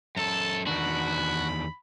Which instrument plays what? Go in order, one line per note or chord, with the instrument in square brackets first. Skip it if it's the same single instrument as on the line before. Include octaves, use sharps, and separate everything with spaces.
[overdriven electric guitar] F#2 A4 [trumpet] A5
[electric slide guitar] E2 D#3 D4 [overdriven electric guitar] F#4 [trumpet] B5